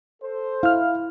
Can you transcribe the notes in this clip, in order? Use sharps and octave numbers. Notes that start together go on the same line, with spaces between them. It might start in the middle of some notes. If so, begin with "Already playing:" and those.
A4 C5
E4 F5 F6